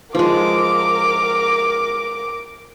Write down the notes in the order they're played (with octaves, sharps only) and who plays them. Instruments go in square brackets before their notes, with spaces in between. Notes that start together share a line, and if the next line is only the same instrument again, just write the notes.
[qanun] F3 G#3 [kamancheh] A#4 D6